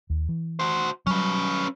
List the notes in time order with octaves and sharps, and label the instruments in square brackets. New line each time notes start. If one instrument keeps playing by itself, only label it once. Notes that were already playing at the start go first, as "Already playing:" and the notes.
[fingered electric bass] D#2
E3
[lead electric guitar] F#4 C5
[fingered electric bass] F#3 G3 [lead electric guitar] C#4 B4